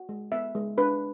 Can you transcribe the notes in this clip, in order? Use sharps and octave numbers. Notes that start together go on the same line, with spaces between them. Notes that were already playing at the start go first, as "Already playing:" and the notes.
Already playing: F#4
G#3
B3 E5
G#3
D4 B4